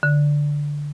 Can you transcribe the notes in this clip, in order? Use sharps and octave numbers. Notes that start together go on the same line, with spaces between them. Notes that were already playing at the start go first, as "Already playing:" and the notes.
D3